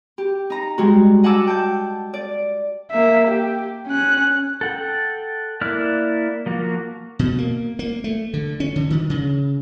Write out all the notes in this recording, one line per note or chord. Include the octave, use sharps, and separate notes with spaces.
G4
D#4 A#5
G3 G#3 F#4
D#5 F#5 G#5 A5 D6 E6
G5 A5 G6
D5
A#3 E5
G4
C#4 F#6
A4 F#5 G5
A#3 E4 D5 F6 F#6
F3 A#3 F#4
B2
A#3
A#3
A3
D3
C#4
D3
D#3
C#3